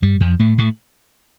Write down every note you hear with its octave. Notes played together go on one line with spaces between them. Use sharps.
G2 G3
F2 F3
A2 A3
A2 A3